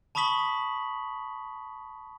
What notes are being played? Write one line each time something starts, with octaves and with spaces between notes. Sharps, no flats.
A5 B5 C#6 D#6 B6 F#7